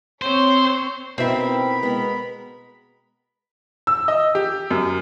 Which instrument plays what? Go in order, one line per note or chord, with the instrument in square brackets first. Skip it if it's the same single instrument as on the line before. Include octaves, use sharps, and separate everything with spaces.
[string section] C4 C#5 [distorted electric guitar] C5
[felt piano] B2 [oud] C4 E5 [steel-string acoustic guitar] D#4 E4 B4 [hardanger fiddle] A#4 B5
[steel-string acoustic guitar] G#3 B3
[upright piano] E6
D#5
G4
F#2